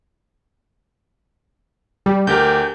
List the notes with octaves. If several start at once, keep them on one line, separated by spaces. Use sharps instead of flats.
G3
D2 G4 A#4 G6